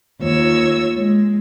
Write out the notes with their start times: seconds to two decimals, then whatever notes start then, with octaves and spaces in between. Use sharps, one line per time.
0.21 D#2 F4 C#5 E6
0.97 G#3